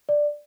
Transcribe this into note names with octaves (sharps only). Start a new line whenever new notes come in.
D5